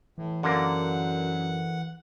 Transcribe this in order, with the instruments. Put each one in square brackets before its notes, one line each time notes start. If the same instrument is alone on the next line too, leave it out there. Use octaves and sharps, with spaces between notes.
[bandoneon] A2 [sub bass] E3
[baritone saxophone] F#2 [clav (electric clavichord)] D3 A#3 [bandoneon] F#5